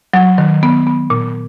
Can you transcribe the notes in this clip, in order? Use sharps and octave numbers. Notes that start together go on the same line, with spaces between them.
F#3
D#3
B3
B3
A#2